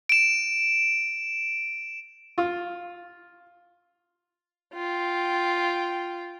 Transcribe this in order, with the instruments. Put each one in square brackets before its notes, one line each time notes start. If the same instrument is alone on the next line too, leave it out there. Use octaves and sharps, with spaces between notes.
[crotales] D7 E7
[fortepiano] F4
[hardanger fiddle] F4 G5